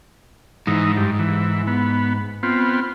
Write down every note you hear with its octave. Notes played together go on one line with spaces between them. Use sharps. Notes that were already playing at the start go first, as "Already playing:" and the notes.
G#2 E3 D#4
G2
E3
B3
B3 C4 F4